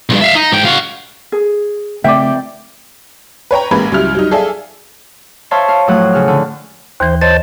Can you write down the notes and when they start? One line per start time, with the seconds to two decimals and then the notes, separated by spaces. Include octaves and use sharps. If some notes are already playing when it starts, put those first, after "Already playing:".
0.10 B1 G2
0.21 E5 F5
0.35 D#4
0.52 G#2 G5
0.65 F#4 F5
1.32 G#4
2.04 C#3 A3 C4 D5 E5 G5
3.51 B4 C#5 G5 A#5
3.71 A1 G#3 A#3 B4 B5 G#6
3.92 C#2 F#3 G3 E4 F6
4.15 F#3 G3 D#4
4.31 G#4 A4 D5 E5 F5 G#5
5.51 C5 C#5 E5 F5 A5 C6
5.68 F5
5.87 A2 F3 F#3 A3 D#6 F#6
6.13 C#3 F6
6.28 D3
7.00 D#2 E3 C5
7.21 C5 C#5 D#5 A5